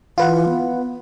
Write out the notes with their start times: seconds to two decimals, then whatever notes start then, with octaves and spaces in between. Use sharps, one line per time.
0.18 E3 F4 B4 F#5
0.49 B3